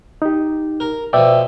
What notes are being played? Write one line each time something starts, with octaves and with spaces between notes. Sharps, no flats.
D#4 G4
A#4
B2 F3 D5 E5 G5